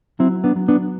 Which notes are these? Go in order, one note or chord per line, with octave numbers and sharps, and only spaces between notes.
F#3 C4 E4
B3 D4
F#3
B3 D4